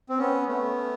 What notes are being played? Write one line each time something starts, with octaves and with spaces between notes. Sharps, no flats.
C4
B3 C#4
A3 B3